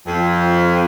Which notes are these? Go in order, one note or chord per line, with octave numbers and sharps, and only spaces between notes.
F2